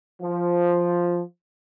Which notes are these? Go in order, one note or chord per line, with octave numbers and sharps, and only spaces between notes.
F3